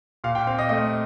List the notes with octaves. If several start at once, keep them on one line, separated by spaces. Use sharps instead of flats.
A#2 F5
G5
C4 F5
D#5
A3 D#5